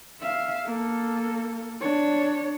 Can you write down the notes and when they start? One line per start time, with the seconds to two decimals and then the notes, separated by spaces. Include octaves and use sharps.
0.20 E5 F5
0.66 A#3 A4
1.81 D4 C#5